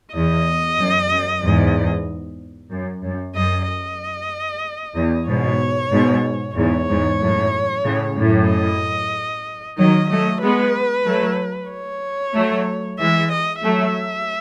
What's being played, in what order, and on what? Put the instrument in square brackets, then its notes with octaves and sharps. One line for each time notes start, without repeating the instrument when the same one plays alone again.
[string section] E2 [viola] D#5
[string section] F#2
F#2
E2 G#2
F#2
F#2
[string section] F#2 [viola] D#5
[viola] D#5
[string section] E2
[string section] G#2 B2 [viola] C#5
[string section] G#2 B2
[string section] E2 G#2 [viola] C#5
[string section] E2 G#2
F#2 A2
A2 C#3
F#2 A2
[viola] D#5
[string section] D#3 F#3 [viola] D#5
[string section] F#3 A3 [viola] D#5
[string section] G#3 B3 [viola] B4
[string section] F#3 A3
[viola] C#5
[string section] F#3 A3
[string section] E3 G#3 [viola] E5
[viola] D#5
[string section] F#3 A3 [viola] E5